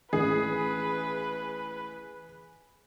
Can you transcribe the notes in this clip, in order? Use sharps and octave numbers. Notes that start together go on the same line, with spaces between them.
A1 G#4 B4